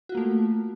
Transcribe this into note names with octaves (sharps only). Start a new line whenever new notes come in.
A3 A#3 F4 F#4